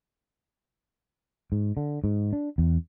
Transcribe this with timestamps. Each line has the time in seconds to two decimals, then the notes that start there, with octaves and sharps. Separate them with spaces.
1.52 G#2
1.77 D3
2.04 G#2
2.33 D4
2.58 E2